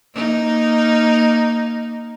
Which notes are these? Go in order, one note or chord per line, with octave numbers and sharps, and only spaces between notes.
A#3 D#4